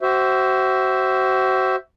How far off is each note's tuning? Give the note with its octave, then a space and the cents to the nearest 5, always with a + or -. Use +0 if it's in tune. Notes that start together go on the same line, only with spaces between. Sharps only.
F#4 +35 C5 +0 E5 +0